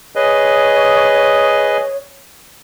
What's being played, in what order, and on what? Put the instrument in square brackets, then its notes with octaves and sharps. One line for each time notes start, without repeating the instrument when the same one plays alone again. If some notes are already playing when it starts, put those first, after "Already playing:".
[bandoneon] G#4 B4 D#5 [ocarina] C#5